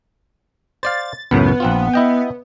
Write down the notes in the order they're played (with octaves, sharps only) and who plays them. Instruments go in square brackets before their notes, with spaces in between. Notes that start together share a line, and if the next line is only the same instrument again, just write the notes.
[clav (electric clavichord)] C5 D5 F5 [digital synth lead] A6
[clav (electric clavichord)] C#2 F#2 A2 [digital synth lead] B3
[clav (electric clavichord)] A#1 C4 F4
E4 D#5 G5